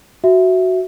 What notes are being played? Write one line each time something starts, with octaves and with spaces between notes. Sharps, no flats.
F#4 E5